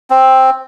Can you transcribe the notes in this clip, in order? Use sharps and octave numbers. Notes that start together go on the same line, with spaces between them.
C4